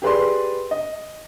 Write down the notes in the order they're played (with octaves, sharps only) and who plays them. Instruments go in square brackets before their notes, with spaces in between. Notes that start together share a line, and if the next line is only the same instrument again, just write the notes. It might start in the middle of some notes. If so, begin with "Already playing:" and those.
[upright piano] G4 G#4 B4 D5 C6
D#5